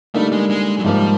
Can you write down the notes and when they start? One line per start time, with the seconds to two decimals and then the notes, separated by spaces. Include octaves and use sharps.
0.14 D3 G3 A3 A#3 D#4
0.32 G#3
0.50 G#3
0.79 F#3
0.84 G#2 F3 G3 A#3